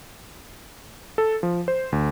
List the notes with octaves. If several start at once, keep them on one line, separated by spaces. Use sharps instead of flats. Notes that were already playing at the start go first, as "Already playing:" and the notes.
A4
F3
C5
D2